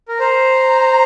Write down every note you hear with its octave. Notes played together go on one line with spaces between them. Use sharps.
A#4
C5 A#5